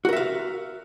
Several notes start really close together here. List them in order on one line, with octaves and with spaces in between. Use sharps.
F#4 A#4 E5 F5